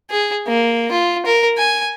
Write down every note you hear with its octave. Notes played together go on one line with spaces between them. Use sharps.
G#4
A#3
F4
A#4
G#5